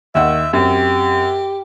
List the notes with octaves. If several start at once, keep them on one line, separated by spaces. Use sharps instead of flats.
D#2 D#3 E5 F#5
F#2 C4 G4